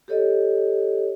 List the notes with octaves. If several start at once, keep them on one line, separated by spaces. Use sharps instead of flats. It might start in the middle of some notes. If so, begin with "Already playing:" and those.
G4 A4 C#5 D#5